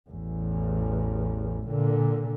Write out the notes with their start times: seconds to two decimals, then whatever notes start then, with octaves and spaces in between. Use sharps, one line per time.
0.10 A1 E2
1.67 A#2 D3